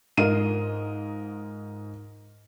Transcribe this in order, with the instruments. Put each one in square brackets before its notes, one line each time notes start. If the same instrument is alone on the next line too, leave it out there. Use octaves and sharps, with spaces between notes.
[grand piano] G#2 F4 [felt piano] A#4 D#5 D#7